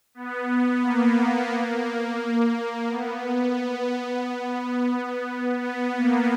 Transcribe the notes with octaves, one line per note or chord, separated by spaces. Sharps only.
B3
B3
A#3
B3
B3
A#3